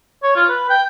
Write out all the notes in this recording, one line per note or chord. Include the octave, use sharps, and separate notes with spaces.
C#5
F4
B4
G5